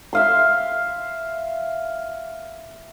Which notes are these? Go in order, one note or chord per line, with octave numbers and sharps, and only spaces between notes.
E5 F5 C6